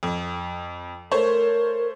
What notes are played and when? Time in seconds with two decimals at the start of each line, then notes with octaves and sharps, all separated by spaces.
0.03 F2
1.11 A3 A#4 C5 C#5